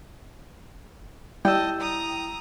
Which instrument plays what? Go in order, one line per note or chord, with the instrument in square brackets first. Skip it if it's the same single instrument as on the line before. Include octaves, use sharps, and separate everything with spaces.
[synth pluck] G3 [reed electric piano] E4 E6 [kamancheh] D#5 A5 [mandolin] G5
[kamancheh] A#5 D#6